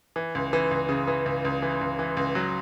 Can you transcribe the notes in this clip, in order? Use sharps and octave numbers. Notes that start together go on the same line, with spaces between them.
E3
C#2
E3
C#2
C#3
E3
C#2
C#2
E3
C#2
E3
C#2
F#3